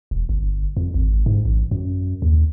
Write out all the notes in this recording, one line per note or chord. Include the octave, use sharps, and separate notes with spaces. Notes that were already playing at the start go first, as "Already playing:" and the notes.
E1
G1
F2
G#1
G#2
A1
F#2
D#2